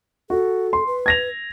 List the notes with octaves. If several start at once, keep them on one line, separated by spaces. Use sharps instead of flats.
F#4 A4
C6
B4
G#6 A#6 F7